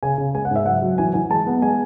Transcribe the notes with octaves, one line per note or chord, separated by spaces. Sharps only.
C#3 G#5
C#3
G#3 G#5
F#5
G#2 E5
F#3 F#5
F#3
E3 G#5
E3 G#5
G#3 A5
B3
G#3 G#5